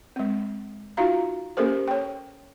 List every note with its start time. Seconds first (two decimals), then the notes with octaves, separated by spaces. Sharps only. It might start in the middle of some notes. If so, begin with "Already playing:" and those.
0.16 G#3 C4
0.97 D#4 F4 F#4 F5 A#5
1.57 A#3 C#4 G4 A4 A#4 C5
1.88 C#5 G5